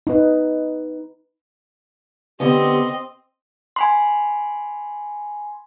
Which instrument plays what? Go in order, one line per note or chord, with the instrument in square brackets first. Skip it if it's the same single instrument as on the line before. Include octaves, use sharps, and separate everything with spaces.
[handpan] D#4 B4
[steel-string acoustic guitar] D3 B3 [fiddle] C4 D#5 [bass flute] G4
[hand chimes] G#5 B5 C6